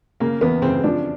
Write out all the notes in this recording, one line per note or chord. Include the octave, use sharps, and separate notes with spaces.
C#3 A#3
E2 B3
C#3 C4
F3 D4